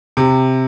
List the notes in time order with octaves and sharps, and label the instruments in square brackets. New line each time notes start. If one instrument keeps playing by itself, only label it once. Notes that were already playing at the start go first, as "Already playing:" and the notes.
[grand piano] C3